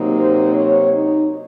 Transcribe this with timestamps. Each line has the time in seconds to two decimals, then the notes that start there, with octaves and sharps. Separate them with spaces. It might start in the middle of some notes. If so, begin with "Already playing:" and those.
Already playing: C3 F#3 A#3 D#4
0.18 C5
0.55 C#5
0.93 D#4